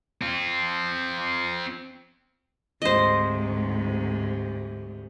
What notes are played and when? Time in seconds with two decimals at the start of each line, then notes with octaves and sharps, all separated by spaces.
0.21 C4 F4
2.82 D2 G#2 C3 C5 D#5